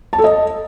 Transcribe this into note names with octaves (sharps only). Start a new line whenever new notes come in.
A5
A4
D#5